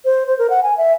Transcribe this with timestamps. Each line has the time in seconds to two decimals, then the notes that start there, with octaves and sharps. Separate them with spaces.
0.05 C5
0.27 C5
0.39 A#4
0.50 F#5
0.63 G#5
0.78 E5